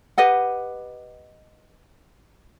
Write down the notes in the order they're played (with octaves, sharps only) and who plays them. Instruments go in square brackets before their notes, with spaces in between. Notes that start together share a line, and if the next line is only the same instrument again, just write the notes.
[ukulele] G4 B4 D#5 F#5